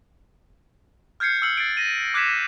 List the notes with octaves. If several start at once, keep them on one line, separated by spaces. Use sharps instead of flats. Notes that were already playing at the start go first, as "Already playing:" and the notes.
F6 G6 G#6 C7 C#7
E6 F6 C7 C#7 F#7
A6 C7 D7
A#6 D#7
D6 F#6 G#6 B6 E7